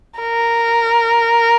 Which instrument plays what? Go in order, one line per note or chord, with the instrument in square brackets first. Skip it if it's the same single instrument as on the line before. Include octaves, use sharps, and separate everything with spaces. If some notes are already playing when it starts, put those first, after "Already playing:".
[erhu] A#4